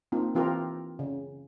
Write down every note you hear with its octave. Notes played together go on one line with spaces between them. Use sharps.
A#3 C4 D#4 F4
E3 C4 F4 G4 A#4
C#3